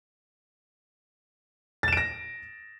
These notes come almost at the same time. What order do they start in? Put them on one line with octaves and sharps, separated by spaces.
A6 E7 D7 A#6